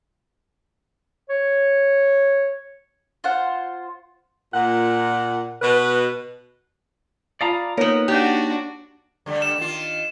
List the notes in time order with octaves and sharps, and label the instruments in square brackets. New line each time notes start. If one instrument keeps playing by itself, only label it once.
[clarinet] C#5
[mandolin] F4 C5 F#5
[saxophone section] A#2 F#5
B2 B4
[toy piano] F4 A5 D#6 [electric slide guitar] D5 F5 A#5
[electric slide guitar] A#3 D#4 [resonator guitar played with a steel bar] B3 A#4 [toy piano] C#5
[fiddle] D4 F#4 [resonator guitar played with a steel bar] G4
[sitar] D3 G3 A3
[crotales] E7
[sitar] D#3 F4